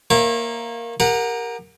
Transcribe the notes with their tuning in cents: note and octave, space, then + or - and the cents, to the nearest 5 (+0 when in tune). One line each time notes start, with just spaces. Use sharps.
A#3 +0 C#5 -35 E5 +15
G4 +40 A#4 +0 F#5 -20